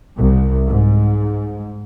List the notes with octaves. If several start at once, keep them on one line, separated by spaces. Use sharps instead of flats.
C2
G#2